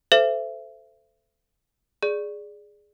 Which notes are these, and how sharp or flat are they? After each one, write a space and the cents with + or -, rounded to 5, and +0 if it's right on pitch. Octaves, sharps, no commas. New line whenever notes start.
A4 +0 C5 -20 E5 +30
G#4 +0 D5 +0